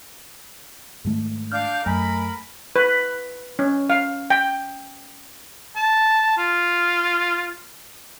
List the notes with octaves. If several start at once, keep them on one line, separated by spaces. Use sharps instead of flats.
G#2 D#3 A3
D4 F5 F6 G6
F#2 A3 A#4 G#5 B5
B4
C#4
F5
G5
A5
F4